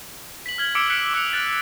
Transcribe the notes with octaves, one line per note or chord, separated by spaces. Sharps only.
B6 F#7
F6 G#6 F#7
D6 E6 B6 C#7 D7
F6 F#6 B6 C#7 D7
D6 F#6 C#7 F7
F#6 A6 D7